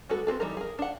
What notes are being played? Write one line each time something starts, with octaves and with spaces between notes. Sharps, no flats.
G3 G#3 B3 F#4 A4
B3 C4 G#4 A4
E3 G3 D#4 A#4
G#4 A#4
D4 F#5